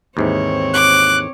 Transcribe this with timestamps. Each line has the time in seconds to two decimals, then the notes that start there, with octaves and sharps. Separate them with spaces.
0.17 D#2 G#2 E3 C4 C#5
0.74 D6 F#6